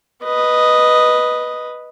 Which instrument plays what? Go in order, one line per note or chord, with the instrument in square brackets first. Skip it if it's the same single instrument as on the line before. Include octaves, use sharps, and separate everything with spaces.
[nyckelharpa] B4 D#5